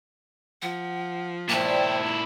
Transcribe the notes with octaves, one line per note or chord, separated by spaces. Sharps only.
F3 F#5
A#2 E4 C5 D5 G5 A5